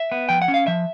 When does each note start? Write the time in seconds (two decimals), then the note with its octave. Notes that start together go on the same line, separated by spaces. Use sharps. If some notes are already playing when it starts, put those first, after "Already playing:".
Already playing: E5
0.12 B3
0.29 F3 G5
0.42 F#5
0.48 C#4
0.54 F5
0.67 F3 E5